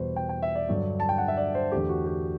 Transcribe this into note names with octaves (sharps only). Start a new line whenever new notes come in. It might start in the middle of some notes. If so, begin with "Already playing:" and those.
Already playing: E2 B2 G3 B4 C5
G5
G5
E5
D5
G2 D3 F#3
A5
G5
F#5
E5
D5
C5
E2 D3 A3 G4
F#4
G4